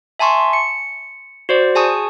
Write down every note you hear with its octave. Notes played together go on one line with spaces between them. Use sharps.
E5 G#5 A5 C6 C#6
C#7
F#4 C5 D5
G#4 G#5 A5 C#6 D#6